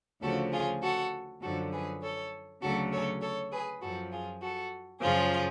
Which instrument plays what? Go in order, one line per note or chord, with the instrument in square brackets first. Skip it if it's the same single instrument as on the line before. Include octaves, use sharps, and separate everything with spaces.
[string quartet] D2 C#3 F3 F#4 A4
F4 G#4
F#4 A4
F#2 D3 F3 F#4 A4
G#4 B4
A4 C#5
D2 C#3 F#3 F#4 A4
A4 C#5
A4 C#5
G#4 B4
F#2 F3 F#4 A4
F4 G#4
F#4 A4
F#2 C#3 F3 F4 G#4